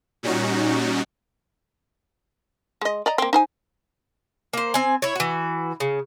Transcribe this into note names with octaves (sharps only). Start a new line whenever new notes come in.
A#2 G3 C#4 D#4 F#4
G#3 D#5
D5 D#5 A#5
A#3 C4
D#4 C5 G#5
A#3 C5
C4 G#5
E4 C#5
E3 F#4
C#3